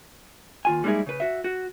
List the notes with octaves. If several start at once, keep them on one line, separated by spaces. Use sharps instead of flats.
D#2 F4 G#5
G3 G#3 A#3 D#4 E4 G#4
C#3 B4
F#4 E5
F#4